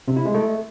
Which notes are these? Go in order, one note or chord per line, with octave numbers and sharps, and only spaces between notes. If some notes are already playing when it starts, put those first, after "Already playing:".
C3
E4
G#3
A3